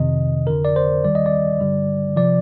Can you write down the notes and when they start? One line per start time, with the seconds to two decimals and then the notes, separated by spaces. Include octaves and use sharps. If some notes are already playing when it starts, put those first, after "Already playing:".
Already playing: F2 C3 D#3 D#5
0.47 G1 F2 D3 A#4
0.65 D5
0.76 C5
1.04 D#2 D#3 G3 D5
1.15 D#5
1.26 D5
1.60 G#1 G2 D3 G3
2.16 C3 F3 D5